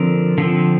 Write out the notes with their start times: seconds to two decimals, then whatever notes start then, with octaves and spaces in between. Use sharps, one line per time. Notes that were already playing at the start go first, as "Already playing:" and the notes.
Already playing: D3 F3 C4 F4 A#4
0.38 D3 F3 C4